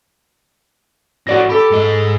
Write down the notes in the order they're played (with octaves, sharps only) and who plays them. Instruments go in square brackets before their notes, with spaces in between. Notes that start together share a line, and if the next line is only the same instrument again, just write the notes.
[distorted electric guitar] A2 C#4 [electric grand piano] F#4 D5 A#6
[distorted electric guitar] G4 [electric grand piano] A4 B5
[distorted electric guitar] G#2 D#5